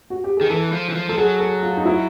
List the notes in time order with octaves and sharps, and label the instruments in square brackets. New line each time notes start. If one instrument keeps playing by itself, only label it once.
[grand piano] F#4
G4
[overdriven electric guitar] D#3 [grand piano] G#4
[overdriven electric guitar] E3 [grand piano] A4
[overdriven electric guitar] F3
E3
F3
[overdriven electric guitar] F3 [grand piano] A4
[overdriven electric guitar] F#3 [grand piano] G#4
[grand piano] A4
F4
D#4
E4